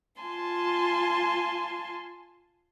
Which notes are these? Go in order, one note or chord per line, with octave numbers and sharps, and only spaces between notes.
F4 G#5 A5 C6